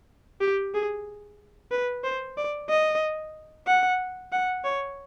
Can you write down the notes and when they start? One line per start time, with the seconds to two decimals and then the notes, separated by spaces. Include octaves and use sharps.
0.41 G4
0.74 G#4
1.71 B4
2.04 C5
2.37 D5
2.69 D#5
3.67 F#5
4.32 F#5
4.64 C#5